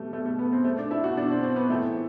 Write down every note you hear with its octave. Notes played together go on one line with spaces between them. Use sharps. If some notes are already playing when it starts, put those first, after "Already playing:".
Already playing: B2 G3 A3
B2 A3
A3
B3
C4
B2 A3
D4
E4
F#4
B2 D4
C4
C4
B3
A2 E3 A3